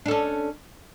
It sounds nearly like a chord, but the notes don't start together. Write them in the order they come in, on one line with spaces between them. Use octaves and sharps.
D4 A4 C#4